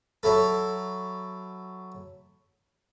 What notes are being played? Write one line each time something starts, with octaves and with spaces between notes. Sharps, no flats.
F#3 E4 A4